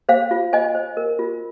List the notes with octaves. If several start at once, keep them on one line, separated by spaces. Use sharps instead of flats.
C5 F5
F4
C5 D#5 G#5
C5
A#4
F4